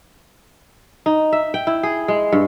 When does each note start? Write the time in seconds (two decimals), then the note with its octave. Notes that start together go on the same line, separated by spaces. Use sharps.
1.06 D#4
1.33 E5
1.54 G5
1.67 E4
1.83 G#4
2.08 G#3
2.32 G2